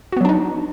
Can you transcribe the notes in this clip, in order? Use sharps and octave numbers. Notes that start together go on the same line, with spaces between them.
F#3 B3 D4 D#4 F#4